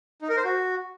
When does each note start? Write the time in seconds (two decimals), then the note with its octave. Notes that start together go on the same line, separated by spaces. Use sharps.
0.22 D#4
0.29 A#4
0.37 C5
0.45 F#4